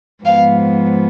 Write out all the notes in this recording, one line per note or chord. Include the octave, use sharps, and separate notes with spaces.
G#2 F3 B3 F5